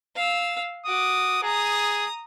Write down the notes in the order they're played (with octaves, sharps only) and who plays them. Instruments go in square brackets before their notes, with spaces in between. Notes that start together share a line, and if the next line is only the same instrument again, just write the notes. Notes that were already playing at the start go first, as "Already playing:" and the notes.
[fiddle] F5 E6
[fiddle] F#4 D6 [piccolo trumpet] D#6
[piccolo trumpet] G#4 [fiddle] A#5 D#6